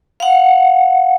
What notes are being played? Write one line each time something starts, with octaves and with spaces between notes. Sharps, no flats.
F5 F#5